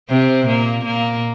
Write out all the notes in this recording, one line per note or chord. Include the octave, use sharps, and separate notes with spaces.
C3 C4
A#2 A#3
A#2 A#3